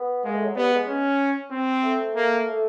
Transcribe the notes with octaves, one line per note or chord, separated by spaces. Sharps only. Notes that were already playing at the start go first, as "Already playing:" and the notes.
Already playing: B3
G#3 A#3
A3
F#3
G3 B3
G#3
C#4
C4
A3
A#3
A3